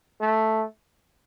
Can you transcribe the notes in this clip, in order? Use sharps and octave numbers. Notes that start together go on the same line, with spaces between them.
A3